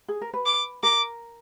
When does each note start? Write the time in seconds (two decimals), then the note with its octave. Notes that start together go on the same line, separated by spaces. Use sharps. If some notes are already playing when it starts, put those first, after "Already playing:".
0.08 G#4
0.21 A#4
0.33 B4
0.46 D6
0.83 A#4 D6